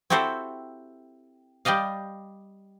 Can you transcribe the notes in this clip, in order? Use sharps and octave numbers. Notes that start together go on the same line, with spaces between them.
C4 E4 F#4 G4 A4 C5
G3 G4 D5 D#5 F5